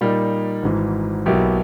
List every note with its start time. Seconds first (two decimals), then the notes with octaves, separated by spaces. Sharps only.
0.01 A#2 G3 A#3 D#4
0.63 G#1 G#2 E3
1.26 B1 B2 A#3 E4 G4